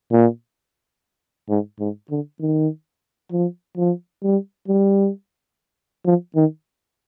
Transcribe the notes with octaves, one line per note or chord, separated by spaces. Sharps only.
A#2
G#2
G#2
D3
D#3
F3
F3
G3
G3
F3
D#3